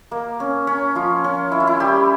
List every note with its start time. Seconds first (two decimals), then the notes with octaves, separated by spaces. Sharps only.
0.11 A#3
0.40 C#4
0.67 C#4
0.95 F3 F4
1.24 C#4
1.52 E4
1.60 F4
1.67 E4
1.80 G3 G4